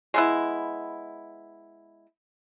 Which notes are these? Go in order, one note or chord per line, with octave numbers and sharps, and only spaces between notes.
G#3 B3 E4